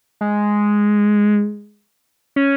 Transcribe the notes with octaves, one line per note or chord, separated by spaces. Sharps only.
G#3
C#4